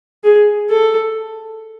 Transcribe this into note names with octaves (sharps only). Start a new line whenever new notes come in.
G#4
A4